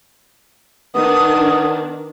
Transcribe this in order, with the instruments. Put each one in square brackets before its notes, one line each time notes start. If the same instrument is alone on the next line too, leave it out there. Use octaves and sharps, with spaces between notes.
[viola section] D#3 D4 [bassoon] B3 [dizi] D#6